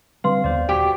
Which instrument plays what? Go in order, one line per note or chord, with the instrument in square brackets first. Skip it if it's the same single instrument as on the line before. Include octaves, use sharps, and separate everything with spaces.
[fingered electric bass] D3 G3 C4 [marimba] B4 C6 [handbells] F5
[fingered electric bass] D#2 B3 [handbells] C5 D5
[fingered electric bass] D#1 [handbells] F#4 G5 [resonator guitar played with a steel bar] G4